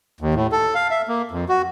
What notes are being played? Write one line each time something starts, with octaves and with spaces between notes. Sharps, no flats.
D#2
A2
A4
F5
E5
A#3
F2
F#4